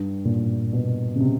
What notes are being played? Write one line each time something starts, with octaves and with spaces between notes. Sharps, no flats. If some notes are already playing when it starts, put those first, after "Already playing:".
Already playing: G2
A#2
B2
C#3
C3